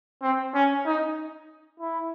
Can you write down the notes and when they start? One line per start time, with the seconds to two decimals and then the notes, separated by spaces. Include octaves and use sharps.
0.22 C4
0.54 C#4
0.86 D#4
1.80 E4